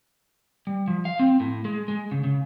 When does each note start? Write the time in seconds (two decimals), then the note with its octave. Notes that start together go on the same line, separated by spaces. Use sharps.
0.67 G3
0.88 F3
1.05 F5
1.20 C4
1.40 A2
1.65 G#3
1.88 G#3
2.12 C#3
2.24 C#3